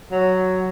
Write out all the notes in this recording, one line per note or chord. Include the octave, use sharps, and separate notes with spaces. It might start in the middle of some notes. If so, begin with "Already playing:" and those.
F#3